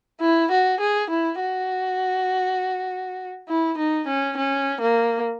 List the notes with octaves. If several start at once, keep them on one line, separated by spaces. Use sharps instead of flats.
E4
F#4
G#4
E4
F#4
E4
D#4
C#4
C#4
A#3